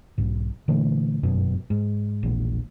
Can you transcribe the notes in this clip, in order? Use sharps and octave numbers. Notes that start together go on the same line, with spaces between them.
B1 G#2
A#2 D3 E3 A3
G1 F#2 B2
G#2
E1 A#1 E2